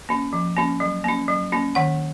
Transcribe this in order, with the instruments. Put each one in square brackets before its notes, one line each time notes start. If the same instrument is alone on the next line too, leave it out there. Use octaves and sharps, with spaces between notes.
[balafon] A#3 C#4
F3
A#3 C#4
F#3
A#3 C#4
F#3
A#3 C#4
D#3 F#5